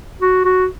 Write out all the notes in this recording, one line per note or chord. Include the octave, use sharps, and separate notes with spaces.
F#4
F#4